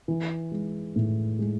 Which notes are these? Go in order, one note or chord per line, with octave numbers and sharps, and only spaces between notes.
E3
G#3
A2
G#3